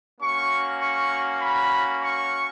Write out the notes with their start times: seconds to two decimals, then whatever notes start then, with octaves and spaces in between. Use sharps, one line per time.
0.19 A#3 C#4 F#4 C#6
0.80 C#6
1.40 B5
2.01 C#6